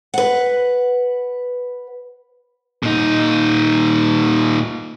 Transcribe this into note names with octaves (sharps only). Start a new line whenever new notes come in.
B4 F#5
A#2 D#4